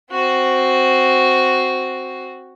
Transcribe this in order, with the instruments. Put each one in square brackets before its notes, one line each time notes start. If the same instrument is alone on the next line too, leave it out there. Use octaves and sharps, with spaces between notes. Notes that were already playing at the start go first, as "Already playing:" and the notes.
[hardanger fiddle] C4 F#4